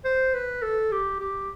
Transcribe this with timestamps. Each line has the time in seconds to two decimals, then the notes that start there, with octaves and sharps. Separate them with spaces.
0.05 C5
0.34 B4
0.62 A4
0.92 G4
1.20 G4